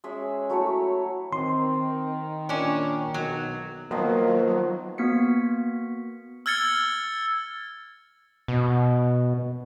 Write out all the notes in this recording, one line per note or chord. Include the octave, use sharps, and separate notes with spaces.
G#3 C#4 G#4 E5
F#3 A3 E4 C#5
D#3 C4 C6
A#2 C#4 D4
B1 F#3
D#3 F3 F#3 A#3 B3
A#3 B3 F#4 B6 C#7
E6 F6 G#6 A6 C#7 G7
B2